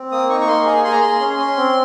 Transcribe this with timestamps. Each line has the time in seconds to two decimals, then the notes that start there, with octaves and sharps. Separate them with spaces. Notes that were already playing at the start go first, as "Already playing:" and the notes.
Already playing: C4
0.12 A#3 D#6
0.29 D#4 C#6
0.40 C#6
0.48 A#3 C6
0.65 G#4 G#5
0.84 G#4 C6
0.92 A#5
1.00 G#4 C6
1.20 C#4
1.38 C#4
1.57 C4